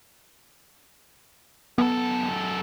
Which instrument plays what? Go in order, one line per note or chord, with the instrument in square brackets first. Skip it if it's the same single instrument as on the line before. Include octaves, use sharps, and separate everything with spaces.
[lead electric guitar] F#2 A4 [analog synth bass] B3